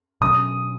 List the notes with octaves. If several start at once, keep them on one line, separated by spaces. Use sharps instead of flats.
B2 F#3 C#4 D#6